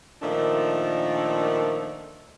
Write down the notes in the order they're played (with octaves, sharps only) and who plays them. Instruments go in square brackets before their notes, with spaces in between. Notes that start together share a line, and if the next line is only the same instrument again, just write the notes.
[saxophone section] A#2 D#3 F3 A3 D4